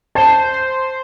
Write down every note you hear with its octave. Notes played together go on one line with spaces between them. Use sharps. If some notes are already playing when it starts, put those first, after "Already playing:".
C5 A5